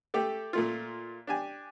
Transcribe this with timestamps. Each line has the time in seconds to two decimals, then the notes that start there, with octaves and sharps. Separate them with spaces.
0.14 A3 G4 A4
0.53 A#2 A3 F4
1.27 D4 G4 G#5